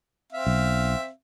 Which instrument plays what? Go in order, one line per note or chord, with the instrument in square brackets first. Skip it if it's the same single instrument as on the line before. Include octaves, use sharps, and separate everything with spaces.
[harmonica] C4 E5 F5
[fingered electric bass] B1